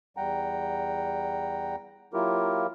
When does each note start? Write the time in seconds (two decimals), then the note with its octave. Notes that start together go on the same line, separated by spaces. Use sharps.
0.17 E2 G3 F#5 G5 A#5
2.13 F#3 A#3 E4 F4 G4 A#4